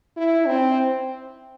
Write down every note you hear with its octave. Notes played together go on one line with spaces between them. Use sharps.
E4
C4